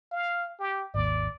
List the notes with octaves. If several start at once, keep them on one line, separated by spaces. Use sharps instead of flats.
F5
G4
G#1 D#2 D5